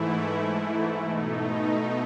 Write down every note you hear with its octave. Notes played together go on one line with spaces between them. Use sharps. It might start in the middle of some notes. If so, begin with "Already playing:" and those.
Already playing: G#2 E3 A3 E4
B2 A3 D#4